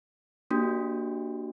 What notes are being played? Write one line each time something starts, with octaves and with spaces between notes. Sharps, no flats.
A#3 D4 F#4 G4